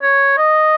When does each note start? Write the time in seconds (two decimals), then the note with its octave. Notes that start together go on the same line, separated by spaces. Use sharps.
0.03 C#5
0.38 D#5